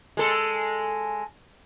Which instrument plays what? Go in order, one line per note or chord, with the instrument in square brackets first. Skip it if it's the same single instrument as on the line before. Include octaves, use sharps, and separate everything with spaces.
[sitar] G#3 A4